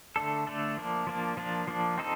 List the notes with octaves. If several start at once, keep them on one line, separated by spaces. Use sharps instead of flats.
D3 A3 D4 A4
D3 A3 D4 A4
F3 A#3 D4
F3 A#3 D4
F3 A#3 D4
F3 A#3 D4
C4 D#4 A4